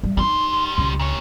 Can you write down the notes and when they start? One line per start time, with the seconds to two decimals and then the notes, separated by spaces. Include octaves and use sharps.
0.04 G3
0.17 G3 D#4 E4 C6
0.78 C#2 C#3
0.99 A#2 C#5